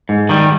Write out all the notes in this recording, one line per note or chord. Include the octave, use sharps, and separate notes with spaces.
G#2
D#3 G3